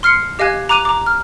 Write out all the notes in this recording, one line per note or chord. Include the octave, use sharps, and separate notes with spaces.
C6 F6 C7 C#7
G4 D#5 F5 G#5 F#6 G#6
A#5 D6 F#6 D#7 F7
A#5 D6
F6